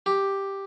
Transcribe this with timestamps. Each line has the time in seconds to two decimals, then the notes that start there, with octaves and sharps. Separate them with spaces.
0.06 G4